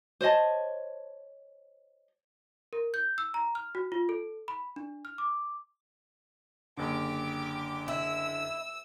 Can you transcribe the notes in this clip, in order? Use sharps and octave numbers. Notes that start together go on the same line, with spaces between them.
C5 C#5 D#5 A5
A#4
G6
E6
A#5
F6
F#4
F4
A4
B5
D4
F6
D6
F#1 D3 G4 D6
E4 E6